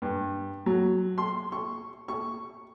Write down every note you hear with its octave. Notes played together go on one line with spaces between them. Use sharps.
G2
F#3
C6
C#6
C#6